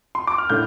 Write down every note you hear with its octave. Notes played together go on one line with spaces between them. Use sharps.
C6
D6
F6
A2 A3 D4 G6